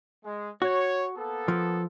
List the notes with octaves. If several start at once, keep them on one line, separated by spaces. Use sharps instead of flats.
G#3
F#4 C#5
A#3 B3 A4
F3